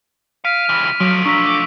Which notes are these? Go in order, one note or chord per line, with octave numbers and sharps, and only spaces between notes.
F5 F6 B6 D7 D#7
C#2 E3
F3 F#3 A3 D7
D4 A#5 C#6 E6 B6
D6